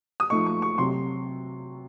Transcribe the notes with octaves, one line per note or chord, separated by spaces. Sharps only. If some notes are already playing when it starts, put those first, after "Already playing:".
D#6
F3 A3 D#4 C#6
C#6
C#6
C3 F#3 C6